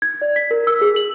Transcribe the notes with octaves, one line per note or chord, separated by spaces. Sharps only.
G#6
D5
B6
A#4
E6
G#4
F#7